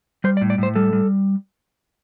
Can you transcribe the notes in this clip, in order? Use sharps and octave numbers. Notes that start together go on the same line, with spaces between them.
G3 C5
D5
A2
D5
A2 C5
G3 A4
G3